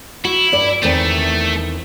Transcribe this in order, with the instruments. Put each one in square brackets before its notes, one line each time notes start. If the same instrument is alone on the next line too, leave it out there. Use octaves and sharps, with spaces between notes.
[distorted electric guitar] E4 [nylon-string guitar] F#4
[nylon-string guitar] G2 D5
[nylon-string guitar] E2 D#3 C4 [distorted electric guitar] A3